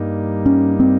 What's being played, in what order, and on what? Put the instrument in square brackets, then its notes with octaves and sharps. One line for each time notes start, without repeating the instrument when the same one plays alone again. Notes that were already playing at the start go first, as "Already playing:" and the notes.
Already playing: [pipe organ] G2 G3 A#3 D#4
[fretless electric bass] C#4
C4